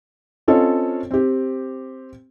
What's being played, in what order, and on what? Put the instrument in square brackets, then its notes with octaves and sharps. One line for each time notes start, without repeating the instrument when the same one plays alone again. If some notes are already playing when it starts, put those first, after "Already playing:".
[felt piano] C4 C#4 F4 A4 C#5 D#5
C4 G4